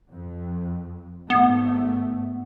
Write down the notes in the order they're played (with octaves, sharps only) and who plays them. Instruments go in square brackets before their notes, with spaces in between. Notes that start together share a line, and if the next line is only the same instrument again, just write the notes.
[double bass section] F2
[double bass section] G#1 G#2 A3 [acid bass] B3